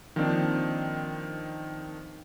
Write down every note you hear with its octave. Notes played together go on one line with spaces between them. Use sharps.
D#3 F3 A#3 C4 D4